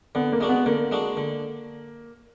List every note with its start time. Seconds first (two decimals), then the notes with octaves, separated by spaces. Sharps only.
0.15 D3 B3
0.32 A#3
0.41 G#3 D4 F#4
0.49 B3
0.66 D3 A#3
0.91 G#3 D4 F#4
1.17 D3